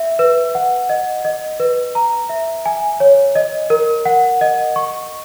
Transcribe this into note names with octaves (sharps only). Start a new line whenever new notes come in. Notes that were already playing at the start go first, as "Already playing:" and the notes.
Already playing: E5
B4
F#5
D#5
D#5
B4
A#5
E5
G#5
C#5
D#5
A#4
F#5
D#5
C#6